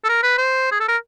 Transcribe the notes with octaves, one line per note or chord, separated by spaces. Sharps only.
A4
A#4
B4
C5
G#4
A4
A#4